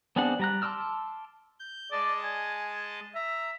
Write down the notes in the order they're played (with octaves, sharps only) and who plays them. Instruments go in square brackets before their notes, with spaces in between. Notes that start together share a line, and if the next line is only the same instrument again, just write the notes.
[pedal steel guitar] B3 C4 D4 G#4 F#5
G3 A#5 F#6
A5 C6 D6 E6 F6
[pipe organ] G6
[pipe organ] G#3 D#5 A5 [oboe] D5
[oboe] G#5
[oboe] E5 [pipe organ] A#5